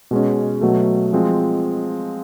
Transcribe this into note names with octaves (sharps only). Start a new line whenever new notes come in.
B2 G#3 C#4
B2 F#3 A3
F3 G#3 C4